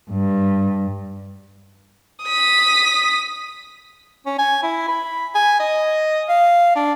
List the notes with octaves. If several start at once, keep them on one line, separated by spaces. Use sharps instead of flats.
G2
D#6 B6
C#4
G#5
E4
B5
G#5
D#5
F5
D4